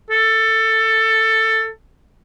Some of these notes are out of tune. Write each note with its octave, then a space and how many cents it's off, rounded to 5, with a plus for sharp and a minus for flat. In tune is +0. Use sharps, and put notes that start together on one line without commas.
A4 +15